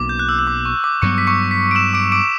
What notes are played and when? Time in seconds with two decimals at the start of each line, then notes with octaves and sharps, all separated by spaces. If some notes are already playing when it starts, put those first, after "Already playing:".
Already playing: B1 B2 A#3 C#4 D6
0.09 G6
0.19 F#6
0.29 E6
0.39 E6
0.47 D6
0.65 C#6
0.84 D6
1.02 G2 F#3 B3 C#6 C#7
1.18 B6
1.27 C#6 C#7
1.51 B6
1.71 D7
1.75 E6 E7
1.94 D6 D7
2.12 D6 D7